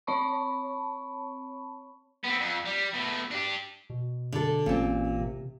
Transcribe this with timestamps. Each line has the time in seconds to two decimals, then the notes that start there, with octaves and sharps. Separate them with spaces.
0.07 C4 C#5 A5 B5 C#6
2.24 B3 C4
2.39 F2
2.65 G3
2.94 B2 A3
3.31 D4 G4
3.90 B2
4.32 D3 A4
4.66 A1 A#2 C4 C#4
5.21 C3